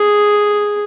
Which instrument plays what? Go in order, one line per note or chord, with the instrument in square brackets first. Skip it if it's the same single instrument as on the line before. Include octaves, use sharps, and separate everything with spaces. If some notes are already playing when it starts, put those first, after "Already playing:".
Already playing: [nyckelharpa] G#4